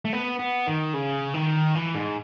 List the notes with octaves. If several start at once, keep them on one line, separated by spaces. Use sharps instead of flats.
A3
B3
B3
D#3
C#3
D#3
E3
G#2